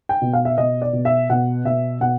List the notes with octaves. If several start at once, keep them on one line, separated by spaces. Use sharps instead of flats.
G5
B2
F5
E5
B2 D#5
D5
B2
E5
B2 F#5
B2 E5
B2 F#5